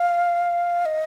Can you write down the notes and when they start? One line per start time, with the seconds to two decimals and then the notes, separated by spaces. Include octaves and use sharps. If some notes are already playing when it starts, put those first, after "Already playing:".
Already playing: F5
0.85 D#5